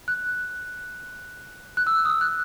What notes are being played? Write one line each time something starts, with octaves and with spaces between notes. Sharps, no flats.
F#6
F#6
E6
D#6
E6
F#6